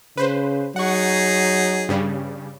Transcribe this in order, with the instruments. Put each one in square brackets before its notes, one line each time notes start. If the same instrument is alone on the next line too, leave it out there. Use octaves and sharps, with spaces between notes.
[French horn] C#3 [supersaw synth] B4 C5
[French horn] F#3 [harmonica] D#4 G#4 [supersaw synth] F#5 C#6
[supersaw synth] G2 C#3 G3